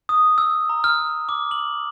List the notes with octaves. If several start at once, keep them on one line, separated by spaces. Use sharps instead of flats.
D#6
E6
A#5
F6
D6
F#7